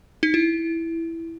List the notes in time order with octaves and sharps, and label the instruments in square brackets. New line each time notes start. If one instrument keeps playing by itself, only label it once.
[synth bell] D#4
E4